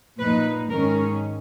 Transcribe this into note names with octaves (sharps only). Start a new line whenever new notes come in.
A#2 F3 A#3 D#4 B4
G#2 D#3 G#3 C#4 A#4